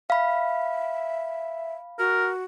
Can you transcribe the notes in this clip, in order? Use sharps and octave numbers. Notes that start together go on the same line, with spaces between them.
E5 F5 B5
F#4 A#4